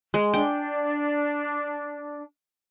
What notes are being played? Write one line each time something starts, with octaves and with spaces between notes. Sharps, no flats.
G#3
D4 G5